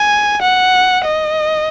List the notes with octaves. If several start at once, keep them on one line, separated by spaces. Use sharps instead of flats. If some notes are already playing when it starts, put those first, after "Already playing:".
Already playing: G#5
F#5
D#5